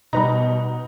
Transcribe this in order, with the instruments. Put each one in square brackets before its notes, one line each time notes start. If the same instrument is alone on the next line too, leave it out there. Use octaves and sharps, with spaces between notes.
[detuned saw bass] B2 [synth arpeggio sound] G3 B4 A#5 [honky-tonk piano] D#4